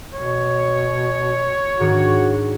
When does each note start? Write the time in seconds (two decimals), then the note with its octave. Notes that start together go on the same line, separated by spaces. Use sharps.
0.15 B2 C#5
1.80 G#2 D#3 D4 F#4